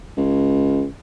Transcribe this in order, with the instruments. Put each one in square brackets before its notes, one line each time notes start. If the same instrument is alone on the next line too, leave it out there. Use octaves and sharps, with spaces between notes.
[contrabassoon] C#2